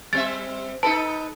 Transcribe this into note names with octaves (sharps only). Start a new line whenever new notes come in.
G3 C4 E5 A6
D#4 A4 B4 A5